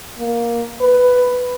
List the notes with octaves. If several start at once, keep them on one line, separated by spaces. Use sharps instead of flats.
A#3
B4